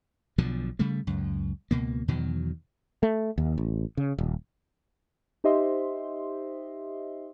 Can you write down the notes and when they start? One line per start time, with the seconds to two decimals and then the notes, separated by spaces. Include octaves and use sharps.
0.38 B1 B2 D3 F3
0.79 C#3 G3 A3
1.07 C#2 F#2
1.71 C#2 B2 A#3
2.08 E2 B2 D#3 F#3
3.03 A3
3.38 D#2
3.58 A1
3.97 C#3
4.18 D#1
5.44 D#4 G4 C5 D#5 E5 C6